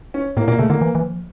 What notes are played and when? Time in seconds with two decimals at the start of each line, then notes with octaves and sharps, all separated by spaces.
0.14 C#4
0.37 A2 A#3
0.48 A#2 A#3
0.59 C#3 A3
0.70 D3 A#3
0.81 E3
0.95 E3
1.03 F3